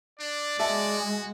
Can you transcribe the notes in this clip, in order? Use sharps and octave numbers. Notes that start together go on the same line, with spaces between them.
D4 D5
G#3 F#4 E5 A5